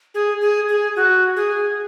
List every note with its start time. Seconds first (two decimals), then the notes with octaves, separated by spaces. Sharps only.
0.14 G#4
0.41 G#4
0.69 G#4
0.96 F#4
1.36 G#4